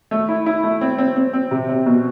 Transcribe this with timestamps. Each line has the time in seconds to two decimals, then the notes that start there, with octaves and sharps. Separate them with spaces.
0.11 A3
0.29 E4
0.46 E4
0.63 A3
0.81 C4
0.98 C4
1.16 C4
1.33 C4
1.51 C3
1.69 C4
1.86 B2